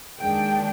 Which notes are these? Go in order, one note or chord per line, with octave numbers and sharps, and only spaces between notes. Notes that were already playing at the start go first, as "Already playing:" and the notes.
D#2 D#3 G#3 D4 G5